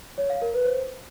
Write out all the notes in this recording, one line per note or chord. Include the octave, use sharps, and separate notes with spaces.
C#5
F5
A#4
B4
C5